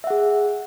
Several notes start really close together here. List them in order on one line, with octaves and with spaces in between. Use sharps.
E5 F#5 G#4